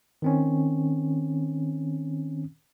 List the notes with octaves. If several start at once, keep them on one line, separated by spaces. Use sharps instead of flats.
D#3 C4 C#4